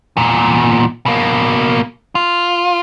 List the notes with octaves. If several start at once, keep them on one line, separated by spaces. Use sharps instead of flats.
E2 A#2
B2 A#3
F4